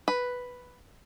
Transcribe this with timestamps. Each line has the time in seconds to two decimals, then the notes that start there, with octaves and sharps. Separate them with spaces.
0.08 B4